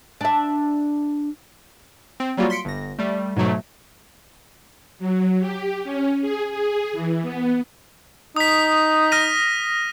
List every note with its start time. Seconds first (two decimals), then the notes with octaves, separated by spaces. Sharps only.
0.21 D4 E5
2.20 C4
2.37 F#3 G3 A#3 F4 F#4
2.50 C6 B6 C#7 D7
2.65 G1 A#6
2.99 G3 A3
3.36 G#2 B2 F#3 A3
4.99 F#3
5.40 G4
5.84 C#4
6.21 G#4
6.51 G#4
6.93 E3
7.22 B3
8.36 D#4 D#6 B6
9.12 F6 A#6 D#7